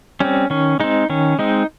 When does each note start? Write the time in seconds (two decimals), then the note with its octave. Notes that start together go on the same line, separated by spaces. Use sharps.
0.20 G3 C4 C#4
0.50 D#3 C#4
0.80 G#3 C4 D#4
1.09 D#3 C#4
1.39 G#3 C4 D#4